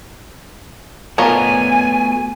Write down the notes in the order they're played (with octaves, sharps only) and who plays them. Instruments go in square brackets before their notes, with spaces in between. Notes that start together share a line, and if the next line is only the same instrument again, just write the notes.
[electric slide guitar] A3 B3 F#4 [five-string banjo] F4 A#4 C#5 [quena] G#5